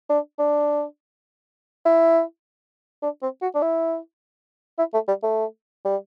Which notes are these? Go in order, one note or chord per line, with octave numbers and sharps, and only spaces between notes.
D4
D4
E4
D4
C4
F#4
D4
E4
E4
A3
G3
A3
G3